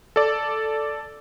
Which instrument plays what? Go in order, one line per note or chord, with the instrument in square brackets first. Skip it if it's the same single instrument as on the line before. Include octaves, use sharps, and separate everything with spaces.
[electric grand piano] A4 D5